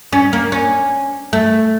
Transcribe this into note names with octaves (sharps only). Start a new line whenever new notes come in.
C#4
A#3
C#4
A3